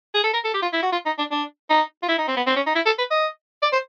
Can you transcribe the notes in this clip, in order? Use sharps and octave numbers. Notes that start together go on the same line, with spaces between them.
G#4
A4
A#4
A4
G4
F4
E4
F#4
F4
D#4
D4
D4
D#4
F4
E4
D#4
C4
B3
C4
C#4
D#4
E4
A4
B4
D#5
D5
C5